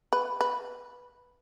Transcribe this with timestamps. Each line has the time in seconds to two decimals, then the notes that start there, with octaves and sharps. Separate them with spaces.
0.13 B4
0.41 B4